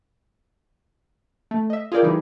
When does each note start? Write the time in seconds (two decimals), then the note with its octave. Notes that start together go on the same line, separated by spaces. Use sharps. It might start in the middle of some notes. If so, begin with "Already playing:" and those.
1.51 A3
1.70 D#5 E5
1.92 F4 G#4 A#4 D5 G5
2.03 E3 G3 D#4 E4 G4 G#4